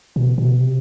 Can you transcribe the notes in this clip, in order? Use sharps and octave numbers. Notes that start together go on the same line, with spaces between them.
B2
B2
C3